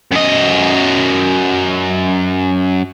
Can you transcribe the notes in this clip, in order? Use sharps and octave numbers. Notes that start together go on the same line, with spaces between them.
F#2 D#5